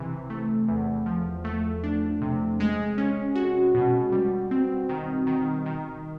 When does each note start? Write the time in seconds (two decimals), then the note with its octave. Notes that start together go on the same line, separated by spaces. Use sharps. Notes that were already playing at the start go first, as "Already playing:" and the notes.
Already playing: C3 E3
0.30 A3
0.68 E2
1.06 F3
1.44 A3
1.84 D4
2.21 C3
2.60 G#3
2.98 C#4
3.35 F#4
3.75 B2
4.12 G3
4.51 C4
4.89 D#3
5.27 D#3
5.66 D#3